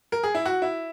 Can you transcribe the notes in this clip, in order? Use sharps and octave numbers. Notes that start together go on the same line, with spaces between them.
A#4
G#4
E4
F#4
E4